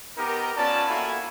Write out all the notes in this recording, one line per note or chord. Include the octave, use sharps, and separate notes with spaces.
B3 D#4 G4 A#4
B3 C#4 F4 D5 A5
A#3 E4 F#4 A4 F5 G#5